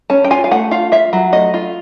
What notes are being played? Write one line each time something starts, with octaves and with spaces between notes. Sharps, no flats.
C#4 A5
G5
F4 G#5
F5
A3 F#5
F4 F5
F4 E5
F#3
A3 D#5
F4